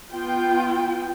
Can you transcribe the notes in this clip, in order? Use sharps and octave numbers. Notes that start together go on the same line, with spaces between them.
B3 F4 G5